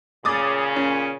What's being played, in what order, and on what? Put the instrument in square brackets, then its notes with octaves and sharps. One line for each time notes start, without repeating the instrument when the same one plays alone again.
[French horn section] A#2 C#3 [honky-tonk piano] D6 D#6 A6
[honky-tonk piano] C#4